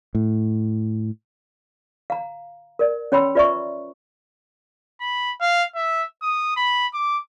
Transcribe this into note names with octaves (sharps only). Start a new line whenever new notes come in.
A2
F5 A#5
A#4 D5
C#4 C#5 G5 B5 C6 E6
F4 B4 D5 E5 A#5 C#6
B5
F5
E5
D#6
B5
D6